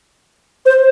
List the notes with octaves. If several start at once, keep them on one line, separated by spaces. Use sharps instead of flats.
C5